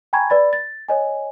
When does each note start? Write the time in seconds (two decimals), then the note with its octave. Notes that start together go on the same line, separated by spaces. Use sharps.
0.13 G5 G#5 A#5 B5 C#6 G#6
0.30 B4 D5 B5 A6
0.53 A6
0.89 C#5 D#5 G#5